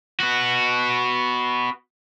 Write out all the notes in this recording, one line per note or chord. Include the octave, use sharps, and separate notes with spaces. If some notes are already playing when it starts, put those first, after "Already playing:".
B3 F#4